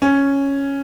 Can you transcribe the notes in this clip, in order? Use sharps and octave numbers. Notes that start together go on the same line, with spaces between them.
C#4